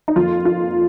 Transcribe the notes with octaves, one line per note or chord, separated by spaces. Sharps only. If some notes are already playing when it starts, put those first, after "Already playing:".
D#4
F2 F3 A#3 F4
F4